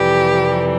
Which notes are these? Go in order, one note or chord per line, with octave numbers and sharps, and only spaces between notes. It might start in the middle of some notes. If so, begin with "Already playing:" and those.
Already playing: F2 C3 E3 G3 G4